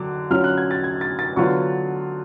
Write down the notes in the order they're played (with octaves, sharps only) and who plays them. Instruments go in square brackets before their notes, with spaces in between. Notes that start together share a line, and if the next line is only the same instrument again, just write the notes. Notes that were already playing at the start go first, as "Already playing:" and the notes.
Already playing: [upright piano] D3 F#3 D6
D3 F#3 C#4 F4 F6
F#6
G#6
A6
G#6
A6
A6
D3 F#3 B3 F4 C#6